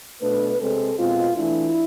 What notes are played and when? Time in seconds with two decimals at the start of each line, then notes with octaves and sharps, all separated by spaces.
0.21 B2 A3 D4 B4
0.60 C3 G#3 C4 A4
0.98 B2 G#3 C4 F4
1.37 E3 A3 D4 E4